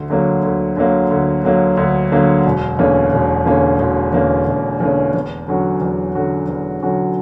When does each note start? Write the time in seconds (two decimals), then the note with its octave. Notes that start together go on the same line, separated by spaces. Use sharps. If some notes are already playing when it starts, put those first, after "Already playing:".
Already playing: D2
0.10 D3 F#3 A#3
0.43 D2
0.76 D3 F#3 A#3
1.10 D2
1.44 D3 F#3 A#3
1.77 D2
2.12 D3 F#3 A#3
2.45 E1
2.79 E2 D3 A#3 C#4
3.12 E1
3.46 E2 D3 A#3 C#4
3.79 E1
4.13 E2 D3 A#3 C#4
4.47 E1
4.80 E2 D3 A#3 C#4
5.14 E2
5.48 D3 F#3 C#4 F#4
5.81 E2
6.15 D3 F#3 C#4 F#4
6.49 E2
6.82 D3 F#3 C#4 F#4